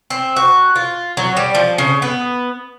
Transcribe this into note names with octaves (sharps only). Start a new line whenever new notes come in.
C4
F#4
F4
F#3
G3
F3
C#3
B3